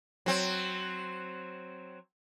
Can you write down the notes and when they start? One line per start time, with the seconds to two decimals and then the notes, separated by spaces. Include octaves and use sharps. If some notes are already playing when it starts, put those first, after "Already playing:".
0.26 F#3 C4